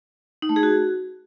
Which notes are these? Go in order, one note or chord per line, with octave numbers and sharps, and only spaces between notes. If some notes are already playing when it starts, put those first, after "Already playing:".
D#4
A3
G#4
F#4